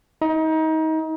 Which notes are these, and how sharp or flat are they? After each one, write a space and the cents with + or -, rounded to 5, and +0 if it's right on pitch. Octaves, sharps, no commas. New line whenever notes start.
D#4 +30